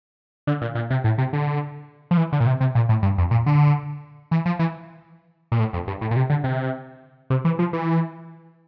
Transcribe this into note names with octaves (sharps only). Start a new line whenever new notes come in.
D3
A#2
A#2
C3
A2
C3
D3
F3
E3
D3
A#2
C3
C3
A#2
A2
G2
F2
A#2
D3
E3
F3
E3
A#2
A2
F2
G2
A2
A#2
C3
D3
C3
C3
E3
F3
E3